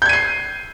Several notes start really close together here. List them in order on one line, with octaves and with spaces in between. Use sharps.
G6 G#6 D#7 C7